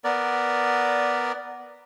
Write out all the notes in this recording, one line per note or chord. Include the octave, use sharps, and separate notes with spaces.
B3 A#4 D5